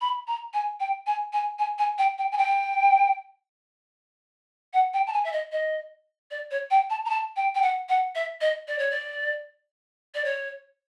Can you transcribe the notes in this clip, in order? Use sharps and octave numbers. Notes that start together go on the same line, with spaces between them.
B5
A#5
G#5
G5
G#5
G#5
G#5
G#5
G5
G5
G#5
G5
F#5
G5
A5
G#5
E5
D#5
D#5
D5
C#5
G5
A5
A#5
A5
G5
G5
F#5
F#5
E5
D#5
D5
C#5
D5
D5
C#5